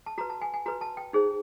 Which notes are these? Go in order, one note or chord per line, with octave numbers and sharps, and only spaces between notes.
A5
F#4 B4 A#5
A5
G#5
G#5
F#4 B4 A#5
A5
G5
D#4 G#4 C5